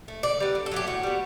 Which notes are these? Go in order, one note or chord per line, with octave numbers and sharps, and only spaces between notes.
A3
D3 D5
G3 B3
D3
A4
F#3 A3 G4
A2 F#4
G3 B3